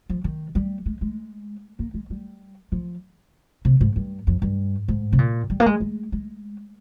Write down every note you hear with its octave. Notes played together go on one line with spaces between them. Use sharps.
F3
D#3
G3
G#3
G#3
A#3
G#3
G3
F3
C3
G#2
G2
F2
G2
G#2
C3
A#2
G3
A#3
G#3
G#3
G#3